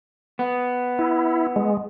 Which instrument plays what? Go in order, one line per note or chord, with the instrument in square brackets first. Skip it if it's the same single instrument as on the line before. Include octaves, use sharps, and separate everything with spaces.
[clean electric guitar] B3
[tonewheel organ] E4
G#3